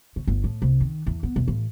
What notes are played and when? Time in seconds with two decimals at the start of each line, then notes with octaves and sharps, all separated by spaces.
0.16 C#3
0.27 G1
0.44 A2
0.62 C2
0.81 D#3
1.07 E2
1.23 B3
1.36 E1
1.48 A1